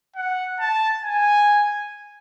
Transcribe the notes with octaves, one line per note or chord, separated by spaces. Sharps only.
F#5
A5
G#5